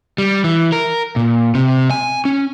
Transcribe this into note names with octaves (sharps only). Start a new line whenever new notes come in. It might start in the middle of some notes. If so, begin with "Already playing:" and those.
G3
E3
A#4
A#2
C3
G#5
C#4